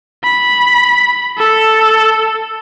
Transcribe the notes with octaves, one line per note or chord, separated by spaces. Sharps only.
B5
A4